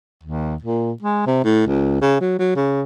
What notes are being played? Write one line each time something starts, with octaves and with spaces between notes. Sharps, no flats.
D#2
A#2
G#3
C3
A2
C#2
C#3
F#3
F#3
C#3